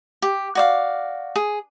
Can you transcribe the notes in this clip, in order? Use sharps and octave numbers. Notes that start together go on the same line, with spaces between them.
G4
F#4 D5 F5
G#4